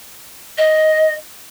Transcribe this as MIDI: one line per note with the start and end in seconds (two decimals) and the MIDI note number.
0.58 1.13 75